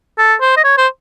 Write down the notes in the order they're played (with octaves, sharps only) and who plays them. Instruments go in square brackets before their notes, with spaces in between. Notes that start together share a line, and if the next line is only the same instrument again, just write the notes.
[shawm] A4
C5
D#5
C#5
C5